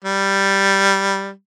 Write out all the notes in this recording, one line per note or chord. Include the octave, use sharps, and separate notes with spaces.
G3